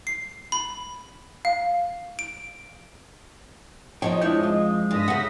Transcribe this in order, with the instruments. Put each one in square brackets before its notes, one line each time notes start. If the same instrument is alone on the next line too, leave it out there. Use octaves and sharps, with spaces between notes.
[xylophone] C7
B5
F5
D7
[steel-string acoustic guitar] F2 G#2 F3 [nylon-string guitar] C#5 [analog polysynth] D#5 [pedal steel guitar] G5
[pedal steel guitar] G#3 G6 [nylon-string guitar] D4 E4 C#5
[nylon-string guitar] F4
[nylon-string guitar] G2 [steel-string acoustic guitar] D3 [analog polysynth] D#6 A#6 B6
[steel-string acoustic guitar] C#3 A4 [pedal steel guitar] E5 [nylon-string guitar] F#5